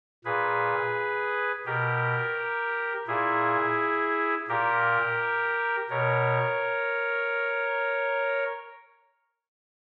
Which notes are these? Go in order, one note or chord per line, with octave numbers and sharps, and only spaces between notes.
A#2 G#4 B4
B2 G4 A#4
A#2 E4 G#4
A#2 G4 A#4
B2 A#4 C#5